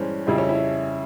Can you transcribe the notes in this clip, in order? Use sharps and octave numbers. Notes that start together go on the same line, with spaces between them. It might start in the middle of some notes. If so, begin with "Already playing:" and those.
Already playing: G2 E3 G#3 C#4 C5
F2 C#3 G3 E4
C#4
E4